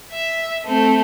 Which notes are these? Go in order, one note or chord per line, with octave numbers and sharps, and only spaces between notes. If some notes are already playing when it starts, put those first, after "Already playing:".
E5
A3 C4